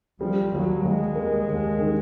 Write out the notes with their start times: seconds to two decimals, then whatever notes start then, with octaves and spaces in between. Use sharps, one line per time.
0.20 F3 G3
0.52 D#2 F#3
0.84 D#2 G#3
1.15 A#3
1.47 D#2
1.79 D#3